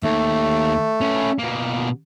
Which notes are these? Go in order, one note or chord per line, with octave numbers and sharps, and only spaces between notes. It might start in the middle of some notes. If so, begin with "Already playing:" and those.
D#2 A3
C#4 B4
B2 A#3